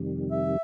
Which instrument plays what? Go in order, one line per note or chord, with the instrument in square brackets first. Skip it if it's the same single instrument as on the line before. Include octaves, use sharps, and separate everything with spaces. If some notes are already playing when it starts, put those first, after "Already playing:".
Already playing: [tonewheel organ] F2 C3 D#3 G3
[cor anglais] E5